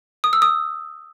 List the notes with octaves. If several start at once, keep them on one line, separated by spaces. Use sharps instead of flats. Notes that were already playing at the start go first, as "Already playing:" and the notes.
D#6
E6
D#6